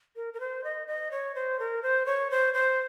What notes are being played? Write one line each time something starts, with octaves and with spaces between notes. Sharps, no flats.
A#4
A#4
C5
D#5
D#5
C#5
C5
A#4
C5
C#5
C5
C5